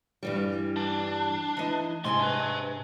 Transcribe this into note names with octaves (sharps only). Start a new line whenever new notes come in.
G2 E3 G3
D4
E3 D#4
E2 G#2 C3 G#5 C6
D4 B4